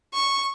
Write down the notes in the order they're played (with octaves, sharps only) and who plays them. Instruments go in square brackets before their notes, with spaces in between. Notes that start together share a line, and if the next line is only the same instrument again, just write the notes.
[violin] C#6